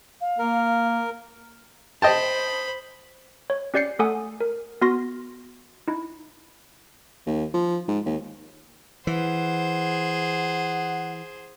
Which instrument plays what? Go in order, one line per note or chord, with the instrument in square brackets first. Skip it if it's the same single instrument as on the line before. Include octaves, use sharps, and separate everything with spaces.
[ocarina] F5
[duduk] A#3 [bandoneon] A#4
[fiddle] C5 B5 [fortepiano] D#5 G5 A5
[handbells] C#5
C#4 G4 D5 G6 C7 C#7
A3 A4 F#5 G#5 D#6
A#4
B3 F#4 C6 A#6
D#4 E4
[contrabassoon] D#2
F3
G#2
D#2
[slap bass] E3 [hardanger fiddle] G#4 C5 [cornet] F#5